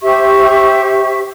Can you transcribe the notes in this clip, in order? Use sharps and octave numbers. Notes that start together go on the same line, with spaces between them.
G4 C5 E5 C#6